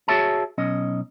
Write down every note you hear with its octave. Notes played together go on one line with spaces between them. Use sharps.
F#4 G#4 C#5 E5 A5
B1 C#4 D#5